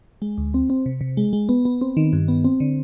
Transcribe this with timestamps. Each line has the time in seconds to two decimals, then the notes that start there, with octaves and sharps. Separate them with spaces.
0.22 G#3
0.38 D2
0.54 C4
0.70 C4
0.86 C3
1.01 C3
1.17 G#3
1.33 G#3
1.49 B3
1.65 B3
1.81 C4
1.97 D#3
2.13 G2
2.28 B3
2.44 C4
2.60 D3